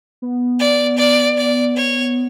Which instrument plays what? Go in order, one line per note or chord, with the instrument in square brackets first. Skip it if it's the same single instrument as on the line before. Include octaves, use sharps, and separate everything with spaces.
[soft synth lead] B3
[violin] D5
D5
D5
C#5